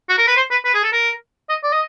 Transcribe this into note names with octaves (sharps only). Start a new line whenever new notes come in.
F#4
A#4
B4
C5
B4
B4
G#4
A4
A#4
D#5
D5
D#5